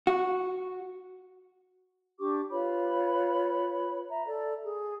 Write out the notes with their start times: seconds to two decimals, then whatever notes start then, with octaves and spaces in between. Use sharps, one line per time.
0.07 F#4
2.19 D4 G4 C#6 D6
2.50 F4 B4 C#5 B5
4.09 E5 A#5
4.27 A4 D5
4.63 G#4